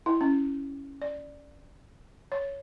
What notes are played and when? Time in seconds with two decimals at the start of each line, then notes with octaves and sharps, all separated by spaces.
0.06 E4
0.21 C#4
1.02 D5
2.32 C#5